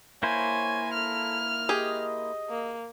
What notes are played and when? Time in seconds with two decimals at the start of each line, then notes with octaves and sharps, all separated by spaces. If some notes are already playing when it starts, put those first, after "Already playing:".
0.23 A#3 E4 C5 C#5 G#5
0.94 A4 F6
1.69 G4 G#4 D#5
2.50 A#3